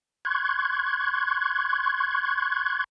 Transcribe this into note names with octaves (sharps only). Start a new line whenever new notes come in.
C6 C#6 F#6 G#6